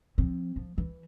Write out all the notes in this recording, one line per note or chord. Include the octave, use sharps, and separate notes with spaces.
F3 C4
F3
E3